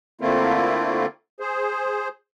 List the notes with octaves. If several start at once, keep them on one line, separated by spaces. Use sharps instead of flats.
D3 A3 A#3 C4 E4 F4
G#4 C5